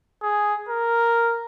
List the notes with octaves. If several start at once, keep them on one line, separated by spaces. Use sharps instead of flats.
G#4
A#4